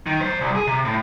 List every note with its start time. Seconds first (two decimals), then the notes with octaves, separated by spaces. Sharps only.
0.06 D#3
0.20 F#2 C5
0.41 C2
0.55 G#4
0.67 C3
0.85 A2